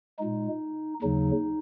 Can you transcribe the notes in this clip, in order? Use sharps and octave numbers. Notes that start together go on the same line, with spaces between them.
A#2 G#3 D#4
D#2 C#3 F#3 D#4